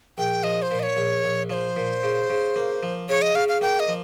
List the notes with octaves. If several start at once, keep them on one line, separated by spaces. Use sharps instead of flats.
A#1 G5
F3 D#5
C5
A#2
D#5
C#5
A#1
A#1
F3 C5 C#5
A#2
C#3
C#3
A#3
F3
C#3 C#5
D#5
C#3 F5
F5
A#3 G5
D#5
F3